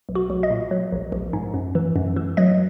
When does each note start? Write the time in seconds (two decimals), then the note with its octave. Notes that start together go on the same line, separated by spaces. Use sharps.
0.09 B1
0.15 F#4
0.30 B1
0.43 D#5
0.50 A#2
0.71 F#3
0.92 A#1
1.12 A#1
1.33 G#2
1.54 F#2
1.75 E3
1.96 F#2
2.16 E3
2.37 F#3 D#5